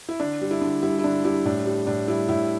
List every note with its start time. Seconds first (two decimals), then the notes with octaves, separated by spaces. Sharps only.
0.09 E4
0.20 D3 D4
0.41 G3
0.51 E4
0.61 D3
0.83 G3 E4
0.99 E4
1.04 D3 D4
1.25 G3 E4
1.45 A2 D4
1.66 G3
1.87 A2 D4
2.08 G3 E4
2.28 A2 E4